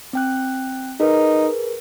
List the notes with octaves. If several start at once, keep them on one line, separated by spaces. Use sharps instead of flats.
C4 G5 F#6
D#4 G#4 A#4 B4